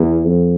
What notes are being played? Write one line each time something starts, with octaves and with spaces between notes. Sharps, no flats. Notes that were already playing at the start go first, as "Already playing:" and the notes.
Already playing: E2
F2